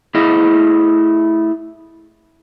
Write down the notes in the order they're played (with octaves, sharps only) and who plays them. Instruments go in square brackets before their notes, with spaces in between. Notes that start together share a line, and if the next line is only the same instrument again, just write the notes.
[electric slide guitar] A3 E4 G#4 D#5